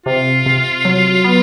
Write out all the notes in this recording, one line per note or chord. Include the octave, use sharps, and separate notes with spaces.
C3 F4
C3
F#3
B3